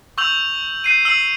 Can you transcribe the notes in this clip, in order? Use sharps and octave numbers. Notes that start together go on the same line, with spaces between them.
C#6 E6 G6 F7 F#7
G6 C7 D#7
E6 C7 D#7 F#7